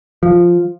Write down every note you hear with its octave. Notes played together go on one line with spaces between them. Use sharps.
F3